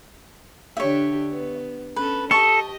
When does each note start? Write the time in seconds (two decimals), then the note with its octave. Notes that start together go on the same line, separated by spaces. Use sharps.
0.77 D3 D4 G4 C#5 E5
1.32 B3
1.96 C#4 A4 B4
2.31 G4 A4 D#5 A5 C#6